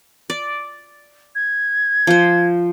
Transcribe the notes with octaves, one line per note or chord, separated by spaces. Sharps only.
D5
G#6
F3 C5